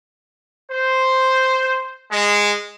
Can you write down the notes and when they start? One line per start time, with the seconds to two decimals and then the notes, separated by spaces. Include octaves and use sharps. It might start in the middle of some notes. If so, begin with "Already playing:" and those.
0.71 C5
2.12 G#3